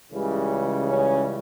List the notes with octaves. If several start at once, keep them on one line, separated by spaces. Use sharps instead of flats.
C#2 C#3 E3 G3
C#4